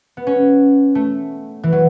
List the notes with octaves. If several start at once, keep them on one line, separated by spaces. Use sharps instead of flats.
B3
C#4
A3
E3
F#3